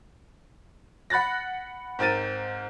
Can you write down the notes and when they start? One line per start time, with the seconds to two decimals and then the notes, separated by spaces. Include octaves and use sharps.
1.10 F#5 B5 F#6 A6 A#6
1.99 G#2 C4 A#4 A6 D#7